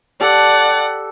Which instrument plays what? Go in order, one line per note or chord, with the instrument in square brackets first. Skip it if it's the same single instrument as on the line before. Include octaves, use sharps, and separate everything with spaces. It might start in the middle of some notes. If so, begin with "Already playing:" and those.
[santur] G4 A4 [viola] D5 F#5